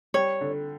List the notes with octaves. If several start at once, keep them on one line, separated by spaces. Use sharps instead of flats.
G3 C#5
D3